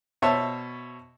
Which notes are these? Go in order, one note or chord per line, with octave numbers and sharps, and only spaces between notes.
B2 C5 C#5 E5 A5